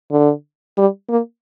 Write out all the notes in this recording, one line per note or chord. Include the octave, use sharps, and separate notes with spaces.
D3
G3
A#3